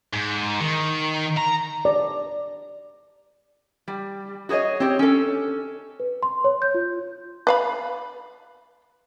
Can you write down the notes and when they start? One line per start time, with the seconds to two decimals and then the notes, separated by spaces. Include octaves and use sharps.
0.13 G#2
0.61 D#3
1.37 A#5
1.85 D5
3.88 G3
4.49 F#4 G#4 C5 C#5 D#5
4.80 C4 G4 C#5
4.99 C#4 A4
6.00 B4
6.23 C6
6.44 C#5
6.62 G6
6.74 F4
7.47 B4 F5 B5